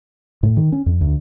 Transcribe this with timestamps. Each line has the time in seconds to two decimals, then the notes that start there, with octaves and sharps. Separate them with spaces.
0.43 A2
0.57 D#3
0.72 C#4
0.86 F2
1.01 D2